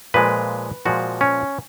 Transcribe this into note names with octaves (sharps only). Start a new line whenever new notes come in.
A#2 F3 G#3 B4
A#2 F3 G#3 F#4
C#4